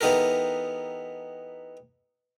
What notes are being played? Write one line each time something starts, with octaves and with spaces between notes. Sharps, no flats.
E3 B3 D#4 G4 A4 A#4